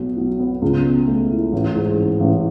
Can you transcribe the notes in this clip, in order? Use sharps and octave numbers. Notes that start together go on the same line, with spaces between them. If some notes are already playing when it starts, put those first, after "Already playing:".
Already playing: B1 B2
F#3
B3
C#2
B2
A3
E4
A1
G#2
E3
A1